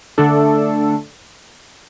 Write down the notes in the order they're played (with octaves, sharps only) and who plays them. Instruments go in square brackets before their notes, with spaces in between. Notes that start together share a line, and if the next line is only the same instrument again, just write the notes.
[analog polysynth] D3 A3 D4 A4